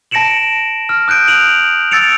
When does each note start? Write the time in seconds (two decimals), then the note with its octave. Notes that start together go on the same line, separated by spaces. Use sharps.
0.11 A5 A#6 C#7 D7 E7 F#7
0.89 F6
1.08 D#6 F#6 G6 D7 D#7
1.28 F7 F#7
1.91 E6 A6 C#7 D7 F7